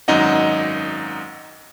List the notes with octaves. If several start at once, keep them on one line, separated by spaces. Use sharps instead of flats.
G#1 F#2 D#4 D#5 F#5